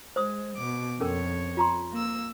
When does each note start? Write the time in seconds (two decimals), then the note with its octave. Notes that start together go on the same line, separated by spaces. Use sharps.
0.16 G#3 C5 D#6
0.56 B2 D6
1.00 F2 C#4 A4 A#4 C#5
1.57 F4 A#5 C6
1.92 A#3 E6